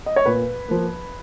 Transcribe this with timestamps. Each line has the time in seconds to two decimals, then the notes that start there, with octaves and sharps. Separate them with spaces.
0.06 D#5
0.16 C#5
0.26 A#2 B4
0.68 F3 A#3